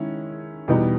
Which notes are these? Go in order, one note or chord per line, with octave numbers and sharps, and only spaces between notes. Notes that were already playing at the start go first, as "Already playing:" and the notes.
Already playing: D#3 G#3 C#4 E4
E2 B2 G3 B3 D#4